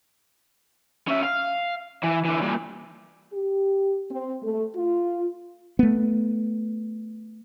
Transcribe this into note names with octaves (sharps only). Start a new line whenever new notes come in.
C#4 E5
F5
E3
D3 E3
A#2 G3
G4
C4
A3
F4
A3 B3